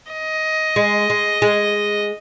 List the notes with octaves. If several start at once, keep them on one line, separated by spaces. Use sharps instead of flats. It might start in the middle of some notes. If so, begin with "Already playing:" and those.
D#5
G#3
G#3
G#3